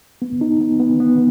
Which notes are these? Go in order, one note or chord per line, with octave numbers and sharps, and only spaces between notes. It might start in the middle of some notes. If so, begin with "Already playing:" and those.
B3
D#4
B3
B3
B3